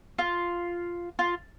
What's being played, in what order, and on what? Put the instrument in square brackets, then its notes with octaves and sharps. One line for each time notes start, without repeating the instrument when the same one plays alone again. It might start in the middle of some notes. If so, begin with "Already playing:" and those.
[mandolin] F4
F4